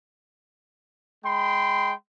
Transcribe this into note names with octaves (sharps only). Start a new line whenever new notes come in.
G#3 G5 B5 C6